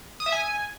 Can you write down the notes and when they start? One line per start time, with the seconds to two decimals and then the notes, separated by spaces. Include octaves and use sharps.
0.20 D#6
0.26 E5
0.32 G#5